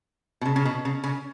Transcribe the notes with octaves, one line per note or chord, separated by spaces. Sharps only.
B2
C#3
C#3
B2
C#3
C#3